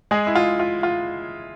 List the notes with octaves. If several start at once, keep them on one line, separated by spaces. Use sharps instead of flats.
G#3 G#4
E4
F4
F4
F4